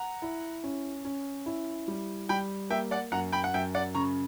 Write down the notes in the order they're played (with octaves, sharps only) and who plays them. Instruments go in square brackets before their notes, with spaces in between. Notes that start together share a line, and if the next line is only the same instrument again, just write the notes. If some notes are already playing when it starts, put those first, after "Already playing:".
Already playing: [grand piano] F#5 A#5
[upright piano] E4
C#4
C#4
E4
G3
[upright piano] G3 [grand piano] G5 B5
[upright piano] A#3 [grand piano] E5 G5
[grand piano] D5 F#5
[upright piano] F#2 [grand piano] F#5 A#5
[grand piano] G5 B5
F#5
[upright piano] F#2 [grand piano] E5 G5
[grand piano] D5 F#5
[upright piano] C#3 [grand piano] A#5 C#6